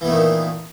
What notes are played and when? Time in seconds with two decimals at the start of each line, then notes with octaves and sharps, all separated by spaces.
0.01 E3
0.04 B3
0.08 A3
0.11 D#3
0.14 A#2